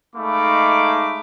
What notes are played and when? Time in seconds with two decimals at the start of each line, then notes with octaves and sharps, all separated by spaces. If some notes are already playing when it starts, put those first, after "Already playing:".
0.16 G#3 A3 D#4 F5 B5 D6